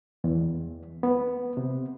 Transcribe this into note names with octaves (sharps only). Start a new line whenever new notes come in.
E2
B3
C3